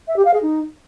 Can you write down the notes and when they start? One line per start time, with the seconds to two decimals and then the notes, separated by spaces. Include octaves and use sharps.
0.08 E5
0.16 G4
0.25 F5
0.34 G#4
0.42 D#4